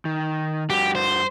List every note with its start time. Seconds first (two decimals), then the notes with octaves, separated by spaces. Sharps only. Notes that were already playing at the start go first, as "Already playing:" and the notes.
0.05 D#3
0.70 G2 F#4 G4
0.95 C5